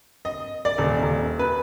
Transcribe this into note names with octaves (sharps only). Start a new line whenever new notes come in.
D#5
D5
D#1
D#1
B4